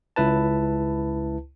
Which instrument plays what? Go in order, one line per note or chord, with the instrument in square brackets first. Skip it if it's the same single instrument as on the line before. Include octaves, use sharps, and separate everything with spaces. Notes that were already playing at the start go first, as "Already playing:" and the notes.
[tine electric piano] C#2 E4 B4 A5